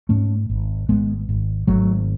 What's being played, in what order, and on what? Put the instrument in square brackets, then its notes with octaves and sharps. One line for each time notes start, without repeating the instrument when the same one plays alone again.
[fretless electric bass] G#2 A3 C#4
G#1
G#1 G#3 B3
G#1
G#1 F#3 A3